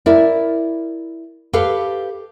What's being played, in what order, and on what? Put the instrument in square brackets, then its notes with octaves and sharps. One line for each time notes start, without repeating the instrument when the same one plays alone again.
[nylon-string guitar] E4 A#4 D5
G4 A4 B4 F5